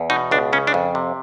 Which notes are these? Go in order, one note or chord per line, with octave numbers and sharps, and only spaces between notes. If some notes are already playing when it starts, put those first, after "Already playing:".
Already playing: E2
B2 D#4
C#2 D4
C#3 C#4
D4
F2
C3